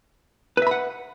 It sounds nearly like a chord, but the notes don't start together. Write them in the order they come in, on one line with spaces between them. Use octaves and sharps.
B4 E5 B5 F#5